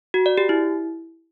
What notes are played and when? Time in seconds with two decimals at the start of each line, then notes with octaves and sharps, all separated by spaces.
0.14 F#4
0.26 D5
0.38 G4
0.49 E4